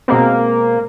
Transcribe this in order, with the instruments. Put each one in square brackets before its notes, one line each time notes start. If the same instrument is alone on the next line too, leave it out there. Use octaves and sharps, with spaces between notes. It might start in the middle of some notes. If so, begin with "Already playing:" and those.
[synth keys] B2 G#3 C4 [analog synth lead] A#3